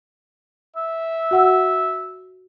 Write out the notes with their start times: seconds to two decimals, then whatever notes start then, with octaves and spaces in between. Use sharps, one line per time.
0.77 E5
1.31 F#4 F#5 E6